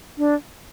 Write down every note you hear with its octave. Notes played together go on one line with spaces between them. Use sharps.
D4